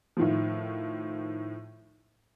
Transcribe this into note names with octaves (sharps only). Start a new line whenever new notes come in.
A2 D#3 F3